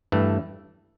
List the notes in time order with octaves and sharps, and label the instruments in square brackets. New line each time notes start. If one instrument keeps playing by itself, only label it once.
[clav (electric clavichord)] G2 E3 A3